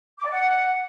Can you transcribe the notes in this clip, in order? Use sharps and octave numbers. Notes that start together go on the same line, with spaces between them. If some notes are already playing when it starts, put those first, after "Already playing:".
D6
D5
F#5